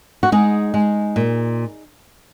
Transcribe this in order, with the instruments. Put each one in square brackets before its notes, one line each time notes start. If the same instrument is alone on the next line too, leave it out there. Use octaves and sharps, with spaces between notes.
[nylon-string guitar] F#4
G#3 D#4 G#4
G#3
A#2